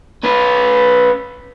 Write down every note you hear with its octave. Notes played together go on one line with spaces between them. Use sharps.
C#4 B4